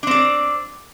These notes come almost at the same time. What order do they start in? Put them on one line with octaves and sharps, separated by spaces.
D4 C4 D5